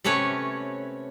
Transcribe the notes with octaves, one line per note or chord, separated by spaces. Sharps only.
C3 A3 C#4 B4 C#5